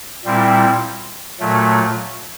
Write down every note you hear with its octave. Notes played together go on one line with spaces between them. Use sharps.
A#2 G3 C4 E4
A#2 F#3 A3